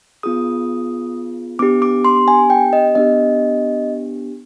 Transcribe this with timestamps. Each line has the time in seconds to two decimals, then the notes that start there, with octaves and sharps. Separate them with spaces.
0.23 B3 F4 G#4 D#6
1.59 B3 D4 G4 D6
1.82 D6
2.05 C6
2.28 G#5
2.50 G5
2.73 D#5
2.95 B3 D4 G4 D#5